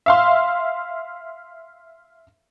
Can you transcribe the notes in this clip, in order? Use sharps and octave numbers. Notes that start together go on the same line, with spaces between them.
E5 F5 C6